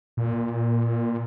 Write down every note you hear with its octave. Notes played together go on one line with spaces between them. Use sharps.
A#2